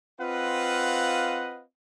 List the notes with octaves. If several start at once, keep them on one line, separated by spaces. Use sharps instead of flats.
C4 F4 B4 D#5 F5 F#5